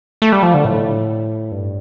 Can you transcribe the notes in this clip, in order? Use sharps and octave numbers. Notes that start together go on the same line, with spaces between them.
A3
G3
F3
D3
A2
G2